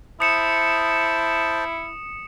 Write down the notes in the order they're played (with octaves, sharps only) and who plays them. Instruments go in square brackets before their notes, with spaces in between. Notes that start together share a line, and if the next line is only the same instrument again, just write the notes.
[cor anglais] E4 [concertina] C5 A5 [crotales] D#6 C#7 E7